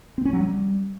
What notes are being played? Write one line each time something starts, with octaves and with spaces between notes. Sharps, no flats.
C4
C#4
F#3
G3